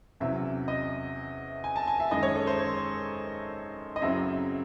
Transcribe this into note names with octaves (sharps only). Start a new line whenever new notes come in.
E2 C3 F#3 C#4 E5
D#5
G#5
A5
G#5
E5
F#2 D#3 G#3 D#4 D#5
C#5
A4
C5
C#5
D#5
F#2 C#3 F#3 C4 E4 E5